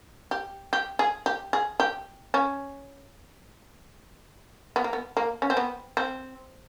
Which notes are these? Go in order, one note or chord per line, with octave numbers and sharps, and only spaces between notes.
G4
G4
G#4
G4
G#4
G4
C#4
B3
A#3
B3
A#3
C#4
C4
B3
C4